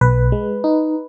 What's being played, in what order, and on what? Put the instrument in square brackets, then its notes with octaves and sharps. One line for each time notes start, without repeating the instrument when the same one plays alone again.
[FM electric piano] B1 B4
G#3
D#4